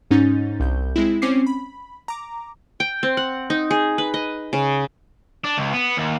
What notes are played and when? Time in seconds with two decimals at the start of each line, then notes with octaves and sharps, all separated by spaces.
0.11 G#2 C#4 D#4 G6 A6
0.60 C2 G6
0.96 G#3 C4 E4
1.22 C4 C#4 C5 D6 C7
1.47 B5
2.08 A#5 D6
2.80 G5
3.03 C4
3.17 F#5
3.50 D#4
3.71 G#4
3.98 B4
4.14 D#5
4.53 C#3
5.45 D4
5.58 C#2
5.74 B3
5.97 D#2